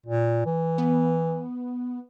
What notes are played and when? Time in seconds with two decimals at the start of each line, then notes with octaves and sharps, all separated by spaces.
0.06 A#2
0.46 E3
0.78 B3